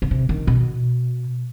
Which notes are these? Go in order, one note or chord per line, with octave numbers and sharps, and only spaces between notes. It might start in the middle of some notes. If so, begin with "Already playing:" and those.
D3
C3
D#3
B2